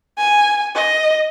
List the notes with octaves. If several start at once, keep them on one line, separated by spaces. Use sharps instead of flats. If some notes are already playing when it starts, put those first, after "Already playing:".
G#5
D#5